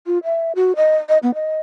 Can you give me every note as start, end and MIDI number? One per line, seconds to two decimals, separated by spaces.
0.07 0.19 65
0.24 0.52 76
0.55 0.73 66
0.76 0.96 75
1.09 1.18 75
1.23 1.34 59
1.34 1.61 75